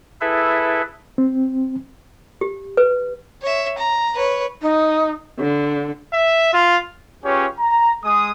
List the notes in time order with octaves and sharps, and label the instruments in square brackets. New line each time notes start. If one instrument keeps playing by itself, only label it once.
[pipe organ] E4 G#4 A4 B4 E5
[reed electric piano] C4
[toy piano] G4
B4
[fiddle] C#5 E5
A#5
B4 C#5
[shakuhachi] D#4
[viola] D3
[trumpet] E5
F4
[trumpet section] C#4 F4 G4 G#4 B4 C#5
A#5
G#3 G#4 D#6